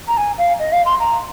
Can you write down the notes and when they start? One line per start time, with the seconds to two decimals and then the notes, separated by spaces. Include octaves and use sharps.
0.08 A#5
0.17 G#5
0.38 F5
0.59 D#5
0.72 F5
0.86 C6
1.00 A#5